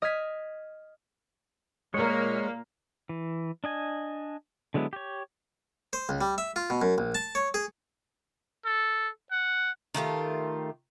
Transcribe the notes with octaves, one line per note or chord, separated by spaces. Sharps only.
D#5 F6 G#6 B6
A#2 G#3 A#3 C#5
E3
D4 D#5 G#5
D3 F#3 G#3 B3 E4
G4 C#5
C5
C#2
G3
E5
F4
B2
F#2
A#1
A5
C#5
G#4
A4
F#5
D#3 A3 F4 G4